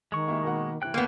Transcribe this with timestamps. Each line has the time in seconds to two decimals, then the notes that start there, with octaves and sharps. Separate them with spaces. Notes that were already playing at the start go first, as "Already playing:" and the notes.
0.12 D#3 G#3 C#6
0.28 A#3 E4 G4
0.43 B2 A#3 F#5
0.82 C3 E3 G5 F#6
0.94 D#2 A#3 B3 G6 C7